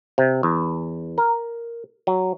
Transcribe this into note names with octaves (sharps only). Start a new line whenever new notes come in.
C3
E2
A#4
F#3